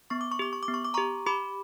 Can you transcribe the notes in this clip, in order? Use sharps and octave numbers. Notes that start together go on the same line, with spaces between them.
B3 C#6
D6
C#6
G4 D6
C#6
D6
B3
C#6
D6
G4 A#5 C#6
G4 B5 D6